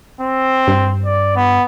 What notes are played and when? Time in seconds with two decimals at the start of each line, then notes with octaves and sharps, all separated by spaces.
0.21 C4
0.68 G2
1.05 D5
1.36 B3